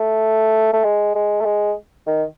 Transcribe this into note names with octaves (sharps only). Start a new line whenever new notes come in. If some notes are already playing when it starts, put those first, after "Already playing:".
Already playing: A3
A3
G#3
G#3
A3
G#3
D#3